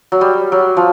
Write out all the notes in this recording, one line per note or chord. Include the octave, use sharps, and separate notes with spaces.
F#3
G3
F#3
F3